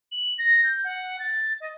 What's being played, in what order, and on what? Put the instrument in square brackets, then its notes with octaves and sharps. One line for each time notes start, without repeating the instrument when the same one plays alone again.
[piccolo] F#7
A#6
G6
F#5
A6
D#5